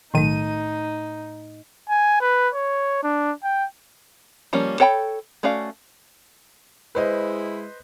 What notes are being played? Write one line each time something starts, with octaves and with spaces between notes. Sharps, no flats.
B1 A2 D#3 A3 D#4 D#7
G#5
B4
C#5
D4
G5
F3 G3 A#3 C#4
A4 C#5 G5 A5 B5
A3 C#4 F#4 D5 F5
G#3 E4 B4 C5 D#5